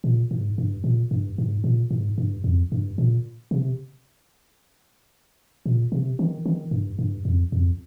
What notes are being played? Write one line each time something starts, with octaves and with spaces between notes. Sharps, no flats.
A#2
G#2
G2
A#2
G2
G#2
A#2
G#2
G2
F2
G2
A#2
C3
A#2
C3
D#3
D#3
G2
G2
F2
F2